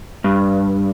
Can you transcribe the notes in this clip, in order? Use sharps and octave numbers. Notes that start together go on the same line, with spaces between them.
G2